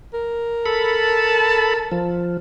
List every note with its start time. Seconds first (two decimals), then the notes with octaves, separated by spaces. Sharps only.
0.14 A#4
0.66 A4 A5 B5
1.92 F3